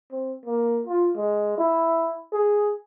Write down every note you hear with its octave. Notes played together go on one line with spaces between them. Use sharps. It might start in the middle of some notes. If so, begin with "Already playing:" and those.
C4
A#3
F4
G#3
E4
G#4